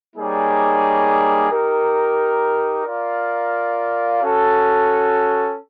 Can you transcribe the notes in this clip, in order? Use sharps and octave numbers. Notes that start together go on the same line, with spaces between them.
G3 A#3 D#4 G#4 C#5
D#4 G4 A#4
F4 A#4 D5 F5
C#4 F#4 A4